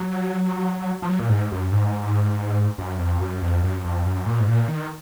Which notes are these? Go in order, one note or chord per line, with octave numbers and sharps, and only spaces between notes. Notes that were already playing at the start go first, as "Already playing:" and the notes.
Already playing: F#3
F3
F#3
A#2
G#2
F#2
G#2
F#2
F2
F#2
F2
F#2
F2
F#2
A#2
G#2
A#2
D#3